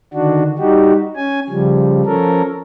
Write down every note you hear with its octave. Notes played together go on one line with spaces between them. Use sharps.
D3 D#3 D4 F#4
G3 D#4 F#4 G4
C#4 G#5
C#3 F3 G3
F3 C#4 A4 A#4